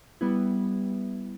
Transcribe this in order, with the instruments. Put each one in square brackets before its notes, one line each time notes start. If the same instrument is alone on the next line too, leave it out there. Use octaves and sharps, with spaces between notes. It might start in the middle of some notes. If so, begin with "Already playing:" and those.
[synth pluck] G3 B3 E4